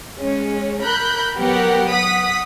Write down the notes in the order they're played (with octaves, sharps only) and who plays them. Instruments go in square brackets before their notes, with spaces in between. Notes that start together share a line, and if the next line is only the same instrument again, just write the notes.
[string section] G#3 C#4
A#4 B5 F#6 G6
F#3 B3 G4 A#4 F#5
F#5 D#6 B6